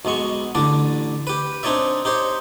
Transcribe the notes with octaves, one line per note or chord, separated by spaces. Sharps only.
B1 B2 G#3 C#6
A1 D3 D4 D5
G4 B4
C4 D4 D#4 C#5 D5 E5
D#4 G4 C5 C#5